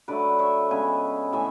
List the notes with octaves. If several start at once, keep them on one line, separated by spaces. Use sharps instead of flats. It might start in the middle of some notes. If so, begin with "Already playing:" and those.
D3 F#3 A3 B4 D5
C#5 E5
C#3 G#3 B3 E5 G#5
A2 E3 A3 E5 G#5